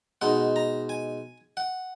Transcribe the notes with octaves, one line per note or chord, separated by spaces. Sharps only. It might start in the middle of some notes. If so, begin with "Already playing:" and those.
B2 G#3 D#4 F#5
A#5
G#5
F#5